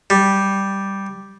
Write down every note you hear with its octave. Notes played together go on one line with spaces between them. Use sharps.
G3